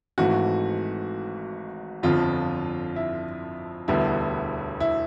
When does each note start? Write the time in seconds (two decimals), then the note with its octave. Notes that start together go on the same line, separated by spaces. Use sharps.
0.18 G#1 G#2 E3 A3 F#4
2.03 G1 F2 D3 F3 F4
2.96 E4
3.88 E1 D2 D3 G3 B3 E4
4.80 E4